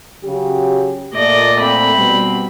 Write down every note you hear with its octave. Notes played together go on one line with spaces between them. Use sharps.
C#3 F#3 G4
A#2 A3 D5 D#5
C4 B5
B2 G3